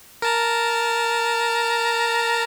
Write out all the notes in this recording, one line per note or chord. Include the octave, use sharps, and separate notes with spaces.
A#4 A5 A#5